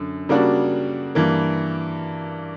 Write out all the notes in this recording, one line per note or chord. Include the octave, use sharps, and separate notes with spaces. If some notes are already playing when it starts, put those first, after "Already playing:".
Already playing: F#2 D3
C#3 G3 A#3 D4 F#4
G2 E3 A#3